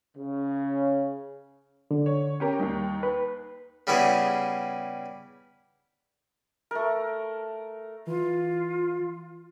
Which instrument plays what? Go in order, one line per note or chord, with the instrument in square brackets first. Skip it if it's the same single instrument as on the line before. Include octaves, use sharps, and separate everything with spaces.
[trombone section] C#3
[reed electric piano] D3
[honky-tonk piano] C#5
C#4 G4 A#4
[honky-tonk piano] D#2 D#4 [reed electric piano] G3 A#3
[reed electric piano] B4
[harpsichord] C#3 G3 B3 E4 G#4
[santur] A3 A#4
[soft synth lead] E3 [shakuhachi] F4